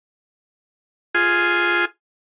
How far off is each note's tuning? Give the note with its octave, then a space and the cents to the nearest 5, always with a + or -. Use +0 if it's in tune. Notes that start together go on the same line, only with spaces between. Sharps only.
F4 +0 G#4 +0 G#5 +0